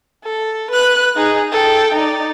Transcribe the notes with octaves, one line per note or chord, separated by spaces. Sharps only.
A4
B4 F#6
D#4 G#4
A4 G5
D#4 D5